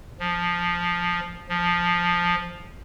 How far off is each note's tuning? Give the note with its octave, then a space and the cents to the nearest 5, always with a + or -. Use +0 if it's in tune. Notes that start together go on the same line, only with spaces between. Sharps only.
F3 +5
F3 +5